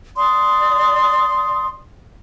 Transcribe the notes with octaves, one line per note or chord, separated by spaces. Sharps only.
D5 C6 D#6